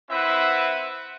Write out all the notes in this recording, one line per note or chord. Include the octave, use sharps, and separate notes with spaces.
C4 E4 B4 E5 F#5